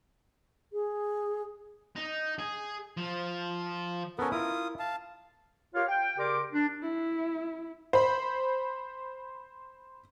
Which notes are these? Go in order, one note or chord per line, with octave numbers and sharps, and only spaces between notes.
G#4
D#4
G#4
F3
B3 C#4 A4 A#4
E4 F4 A#4 D#6
F5 A5
F4 G4 A#4 C#5 F5
G5
C#3 G4 A#4 D5 C6 D6
D4
E4
C5 B5